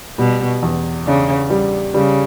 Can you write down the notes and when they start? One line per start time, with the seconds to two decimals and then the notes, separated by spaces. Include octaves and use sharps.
0.18 B2 G3
0.63 E2
1.06 C#3 D4
1.50 G3
1.94 C#3 G3